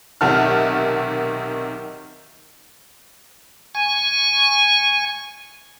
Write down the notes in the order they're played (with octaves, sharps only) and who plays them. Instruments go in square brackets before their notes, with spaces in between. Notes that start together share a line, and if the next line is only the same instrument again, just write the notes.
[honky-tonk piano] B1 C3 D#3 F#5 A5 F6
[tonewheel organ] G#5 C#6